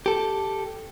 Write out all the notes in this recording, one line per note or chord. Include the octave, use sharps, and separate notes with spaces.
G4 A4